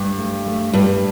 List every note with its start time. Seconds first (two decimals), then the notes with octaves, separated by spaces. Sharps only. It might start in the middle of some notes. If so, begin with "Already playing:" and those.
Already playing: G2
0.18 A3
0.46 A3
0.73 G2 G3